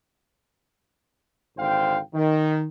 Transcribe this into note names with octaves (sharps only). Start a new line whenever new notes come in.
G#1 D3 C5 F5 G5
D#3